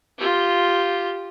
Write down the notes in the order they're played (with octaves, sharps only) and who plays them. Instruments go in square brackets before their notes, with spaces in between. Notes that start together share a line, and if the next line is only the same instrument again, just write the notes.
[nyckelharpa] F4 G4